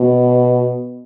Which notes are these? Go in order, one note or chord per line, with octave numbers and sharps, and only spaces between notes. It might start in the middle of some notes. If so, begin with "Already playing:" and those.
Already playing: B2